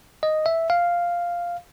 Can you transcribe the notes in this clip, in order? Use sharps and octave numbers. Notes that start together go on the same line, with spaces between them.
D#5
E5
F5